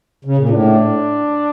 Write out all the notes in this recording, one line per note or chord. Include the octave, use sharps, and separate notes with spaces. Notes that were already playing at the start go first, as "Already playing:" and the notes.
C#3
A#2
A2 D4